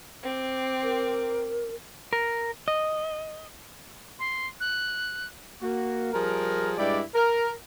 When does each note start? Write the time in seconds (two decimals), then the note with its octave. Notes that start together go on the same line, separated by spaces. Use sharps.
0.23 C4 D6
0.83 A#4
2.13 A#4
2.68 D#5
4.19 C6
4.60 F#6
5.62 A#3 F#4
6.13 F3 G3 G#4 A#4
6.78 G2 G#3 E4 G4 D5
7.15 A#4